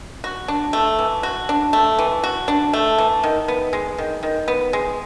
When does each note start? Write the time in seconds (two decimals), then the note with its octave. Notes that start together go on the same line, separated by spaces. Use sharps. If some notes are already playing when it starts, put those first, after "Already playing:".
0.24 F#4
0.48 D4
0.73 A3
0.99 E3
1.23 F#4
1.49 D4
1.73 A3
1.99 E3
2.23 F#4
2.48 D4
2.73 A3
2.98 E3
3.23 D#3
3.48 B3
3.73 G#3
3.98 D#3
4.23 D#3
4.48 B3
4.73 G#3